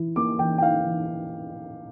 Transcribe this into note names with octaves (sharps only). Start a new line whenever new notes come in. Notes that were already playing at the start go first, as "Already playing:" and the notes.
Already playing: E3 E4
A#3 D6
E3 G5
G5
E4 F5
E3